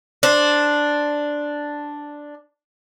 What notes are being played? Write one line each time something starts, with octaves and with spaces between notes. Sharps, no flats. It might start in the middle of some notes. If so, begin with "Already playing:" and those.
D4 C5